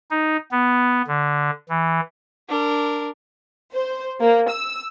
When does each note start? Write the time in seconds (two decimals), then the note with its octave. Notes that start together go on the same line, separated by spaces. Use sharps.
0.11 D#4
0.51 B3
1.07 D3
1.69 E3
2.48 D4 A#4
3.72 C5
4.20 A#3
4.50 E6